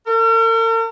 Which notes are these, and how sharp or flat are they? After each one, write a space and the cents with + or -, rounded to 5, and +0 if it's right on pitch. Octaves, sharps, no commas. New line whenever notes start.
A#4 -45